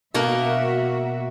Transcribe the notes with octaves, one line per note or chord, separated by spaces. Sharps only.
B2 A#3 F#4 A#4 E5